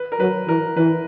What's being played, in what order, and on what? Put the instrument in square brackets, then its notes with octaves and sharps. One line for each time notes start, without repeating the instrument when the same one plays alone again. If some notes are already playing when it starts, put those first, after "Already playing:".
Already playing: [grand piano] B4
A#4
[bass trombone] F#3 [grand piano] B4
[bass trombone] E3 [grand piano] A#4
[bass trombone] E3 [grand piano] B4